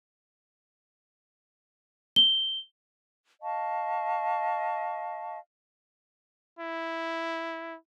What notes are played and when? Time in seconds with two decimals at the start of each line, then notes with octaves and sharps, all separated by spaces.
2.16 G7
3.42 D#5 F5 A5 C#6
6.59 E4